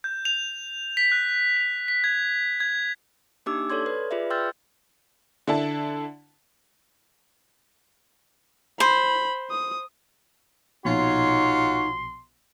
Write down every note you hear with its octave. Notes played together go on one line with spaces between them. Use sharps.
G6
F7
B6
F#6
F7
B6
G#6
G#6
A#3 D4 D#4 G4 D6 E6
A4 C#5 D5 C6 G#6
B4
F4 G#4 B4 D5 E5
G5 C6 E6 F6 G6 A6
D3 E4 A5
C5 B5
D#6
A#1 B2 D#4 F4 F#4 C#5 C6